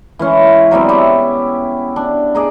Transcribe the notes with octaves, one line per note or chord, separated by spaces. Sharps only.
E3 G#3 C#4
F#3 G3 B3 C4
C#4 E4 G4 E5
D4
D#4 G#4 D5